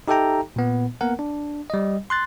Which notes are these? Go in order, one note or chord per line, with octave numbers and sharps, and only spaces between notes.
D#4 G4 A4 E5 G5 A#5
A#2 B3
A#3 B3 A#4 F#5
D4
G3 D#5
C6 F#6 A6